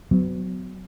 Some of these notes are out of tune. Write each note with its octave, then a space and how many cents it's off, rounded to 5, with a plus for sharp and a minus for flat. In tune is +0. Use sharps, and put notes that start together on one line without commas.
F#3 +0 B3 +35